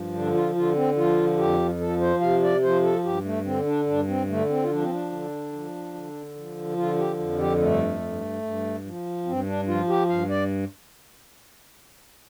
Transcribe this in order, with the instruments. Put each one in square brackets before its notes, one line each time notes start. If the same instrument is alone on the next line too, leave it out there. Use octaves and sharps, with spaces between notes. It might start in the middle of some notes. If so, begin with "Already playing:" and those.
Already playing: [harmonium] G2 F3
D3 D4
F4
D3 F4
C4
F3 F4
F2 G4
F3 A4
C5
C3 F5
D5
F3 C5
A4
G2 G4
A3
D3 C4
D4
G2 D4
C4
D3 A3
C4
F4
F3 D4
C4
D4
D3
F3
D3
F3
D3 F4
G4
F2
G4
G2 A3
G2
G2
F3
G2 C4
D4
F3 F4
G4
G2 F5
D5